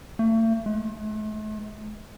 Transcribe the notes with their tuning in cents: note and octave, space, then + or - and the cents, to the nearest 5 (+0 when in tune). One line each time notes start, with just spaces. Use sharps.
A3 +40
A3 -45